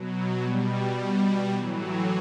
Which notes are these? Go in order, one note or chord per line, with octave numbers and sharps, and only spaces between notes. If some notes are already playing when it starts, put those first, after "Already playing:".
Already playing: B2 F#3
B2 G3
B2 G3
A2 E3 F#3